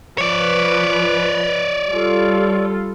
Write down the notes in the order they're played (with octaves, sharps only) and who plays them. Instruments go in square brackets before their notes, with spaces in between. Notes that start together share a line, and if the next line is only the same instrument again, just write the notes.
[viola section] F3 B4 [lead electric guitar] C#5 D5
[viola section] G3 F4 A4